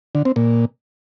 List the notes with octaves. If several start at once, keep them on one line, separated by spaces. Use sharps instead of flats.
D3
C4
A#2